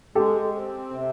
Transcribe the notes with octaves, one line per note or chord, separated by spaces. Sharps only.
G#3 G4 A4
C4
C3